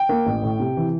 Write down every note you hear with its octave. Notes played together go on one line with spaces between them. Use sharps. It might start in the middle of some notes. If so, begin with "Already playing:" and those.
Already playing: G5
A#3
A1
A2
C3
E3